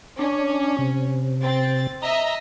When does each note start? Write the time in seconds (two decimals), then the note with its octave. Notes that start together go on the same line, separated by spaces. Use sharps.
0.19 C#4 D4
0.79 C3
1.42 C4 A6
2.02 D#5 E5 A#5